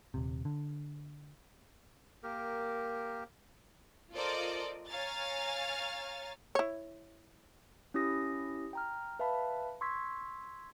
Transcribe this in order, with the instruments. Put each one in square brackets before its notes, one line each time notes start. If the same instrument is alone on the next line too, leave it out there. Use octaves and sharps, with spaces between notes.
[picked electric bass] D#1 C3
D3
[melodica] A#3 G4 A#4
[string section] F4 A4 A#4 C5 D5 D#5
C#5 F5 G#5 A#5 F6 A6
[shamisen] E4 C#5
[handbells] C#4 E4 G4 D#6 A#6
G5 A#5 F6
B4 E5 F5 A5 B5
C6 C#6 E6 G#6 B6